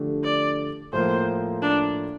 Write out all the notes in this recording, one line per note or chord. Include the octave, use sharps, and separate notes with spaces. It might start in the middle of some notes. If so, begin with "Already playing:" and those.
Already playing: D3 F3 A3 D4 G4
D5
A2 F3 A#3 C5
D4